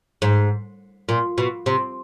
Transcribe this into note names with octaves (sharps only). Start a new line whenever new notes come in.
G#2
A#2
B2
C3